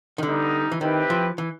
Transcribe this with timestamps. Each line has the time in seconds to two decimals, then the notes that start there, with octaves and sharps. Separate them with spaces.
0.18 D#3
0.23 D3 G3 B3 D#4
0.72 E3
0.81 D#3 C4 E4 G4 B4
1.10 F3
1.38 E3